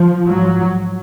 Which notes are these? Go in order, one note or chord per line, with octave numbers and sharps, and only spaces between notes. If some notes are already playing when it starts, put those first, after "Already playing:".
Already playing: F3
G#2 F#3